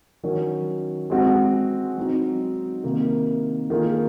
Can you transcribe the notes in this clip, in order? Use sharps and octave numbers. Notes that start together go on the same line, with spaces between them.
D#3 F#3 C#4
G#3 C4 F#4
F#3 C4 D#4
C3 D#3 A#3
D#3 A#3 F4 G#4